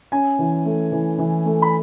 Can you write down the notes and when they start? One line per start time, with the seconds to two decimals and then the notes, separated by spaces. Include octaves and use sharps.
0.12 C#4 G#5
0.39 E3
0.65 A3
0.92 E3
1.19 E3
1.46 A3
1.62 B5